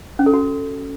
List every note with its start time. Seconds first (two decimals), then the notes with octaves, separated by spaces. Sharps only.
0.19 C#4
0.26 A4
0.34 F#4